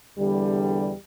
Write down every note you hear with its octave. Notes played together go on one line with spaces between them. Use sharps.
E2 D3 G3